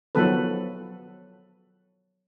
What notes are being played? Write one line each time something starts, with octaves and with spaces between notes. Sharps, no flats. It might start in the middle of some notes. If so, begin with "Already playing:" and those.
D#3 F3 F#3 B3 A4 B4